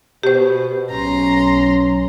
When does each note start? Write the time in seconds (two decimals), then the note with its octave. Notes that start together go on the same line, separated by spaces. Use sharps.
0.23 B2 G4 C5
0.91 B1 C#4 A#5 C6